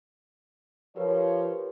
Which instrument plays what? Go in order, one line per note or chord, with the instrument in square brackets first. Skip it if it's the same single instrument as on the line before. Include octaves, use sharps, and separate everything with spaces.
[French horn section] F3 C#5 [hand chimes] G4 A#4 B4